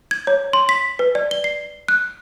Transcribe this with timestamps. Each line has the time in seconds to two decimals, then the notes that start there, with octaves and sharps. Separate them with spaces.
0.11 G#6
0.27 C#5
0.53 C6
0.69 B6
0.99 B4
1.15 D5
1.31 G7
1.44 C7
1.88 F#6